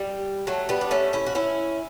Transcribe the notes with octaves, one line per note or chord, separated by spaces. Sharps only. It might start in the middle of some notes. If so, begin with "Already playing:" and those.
Already playing: G3
F#3 A3
G3 B3
D4
A3 C#4
C#4 E4
F#4
C#4 E4